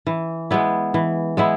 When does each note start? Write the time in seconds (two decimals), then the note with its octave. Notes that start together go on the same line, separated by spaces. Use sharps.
0.07 E3
0.51 G#3 B3 E4
0.94 E3
1.37 G#3 B3 E4